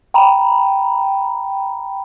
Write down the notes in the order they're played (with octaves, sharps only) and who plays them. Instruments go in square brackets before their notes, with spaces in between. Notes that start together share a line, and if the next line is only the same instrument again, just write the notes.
[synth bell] G5 A#5 B5